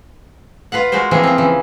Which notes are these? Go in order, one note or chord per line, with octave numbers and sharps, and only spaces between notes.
F4 B4 F5 F#5
G#3 F#4 A#4 C5
E3 F3 A#3 C4 G#4 A#4
C4 F4
C#3 E3